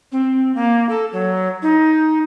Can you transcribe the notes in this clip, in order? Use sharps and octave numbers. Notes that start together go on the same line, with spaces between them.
C4
A#3
A4
F#3
D#4